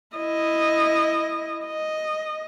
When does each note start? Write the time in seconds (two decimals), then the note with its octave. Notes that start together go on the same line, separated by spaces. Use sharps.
0.17 E4 D#5
1.66 D#5